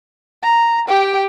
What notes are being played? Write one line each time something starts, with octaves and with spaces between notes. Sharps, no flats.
A#5
G4 G5